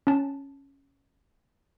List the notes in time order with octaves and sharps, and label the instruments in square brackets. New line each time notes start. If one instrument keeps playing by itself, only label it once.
[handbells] C#4 A5